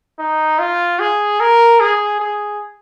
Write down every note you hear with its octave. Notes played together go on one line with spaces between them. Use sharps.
D#4
F4
G#4
A#4
G#4
G#4